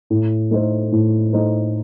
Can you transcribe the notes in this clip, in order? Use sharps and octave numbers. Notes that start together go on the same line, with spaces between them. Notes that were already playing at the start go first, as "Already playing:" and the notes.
A2
A3 D#4 A4 C5
A2
A3 D#4 A4 C5